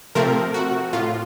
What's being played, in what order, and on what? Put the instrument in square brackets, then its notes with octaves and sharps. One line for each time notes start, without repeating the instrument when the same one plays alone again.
[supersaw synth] C3 F3 A3 C4 A#4
F#4
A2 F4